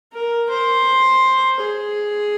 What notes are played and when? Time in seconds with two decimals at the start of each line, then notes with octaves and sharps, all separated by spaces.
0.12 A#4
0.49 C5
1.60 G#4